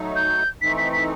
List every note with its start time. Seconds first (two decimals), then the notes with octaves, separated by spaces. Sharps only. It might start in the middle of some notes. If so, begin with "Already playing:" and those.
Already playing: F#3 A3 D#4
0.16 G6
0.62 E3 A3 C4 D#4 B6
0.78 B6
0.93 B6